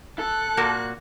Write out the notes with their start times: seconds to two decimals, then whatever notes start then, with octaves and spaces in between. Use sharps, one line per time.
0.19 A4 F#6
0.57 A#2 A#3 F#4